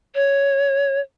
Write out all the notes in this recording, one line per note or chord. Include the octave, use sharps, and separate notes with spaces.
C#5